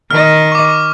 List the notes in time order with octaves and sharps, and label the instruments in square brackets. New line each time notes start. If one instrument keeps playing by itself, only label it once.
[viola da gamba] D#3 D#5 [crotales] F6
[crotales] C#6 D6